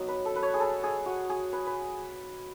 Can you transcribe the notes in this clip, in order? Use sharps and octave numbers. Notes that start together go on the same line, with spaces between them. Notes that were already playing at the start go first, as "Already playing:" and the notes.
Already playing: F#3 B3 D#4
B4
A4
B4
C#5
G#4
A4
G#4
F#4
G#4
B4
B4